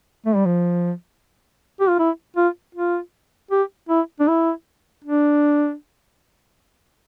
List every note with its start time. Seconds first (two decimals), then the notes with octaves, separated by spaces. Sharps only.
0.26 A3
0.36 G3
0.45 F3
1.80 G4
1.89 F4
1.99 E4
2.36 F4
2.75 F4
3.51 G4
3.89 E4
4.20 D4
4.28 E4
5.04 D4